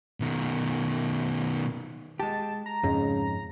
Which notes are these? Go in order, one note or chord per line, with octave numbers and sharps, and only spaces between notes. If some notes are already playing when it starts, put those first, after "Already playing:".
B2 D#3
G#3 G4 A5
A#5
F2 G#2 C#3